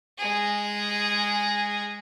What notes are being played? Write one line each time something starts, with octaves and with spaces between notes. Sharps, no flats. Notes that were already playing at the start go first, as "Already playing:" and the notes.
G#3 G#4